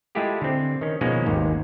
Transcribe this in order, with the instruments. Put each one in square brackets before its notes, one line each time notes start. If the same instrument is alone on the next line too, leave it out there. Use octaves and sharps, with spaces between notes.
[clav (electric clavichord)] G#3 A3 E4 F4 G4 G#4
D3 C4
D#3 C#4
B2 D#3 F3 G#3 A#3 C#4
G#1 D#2 G#2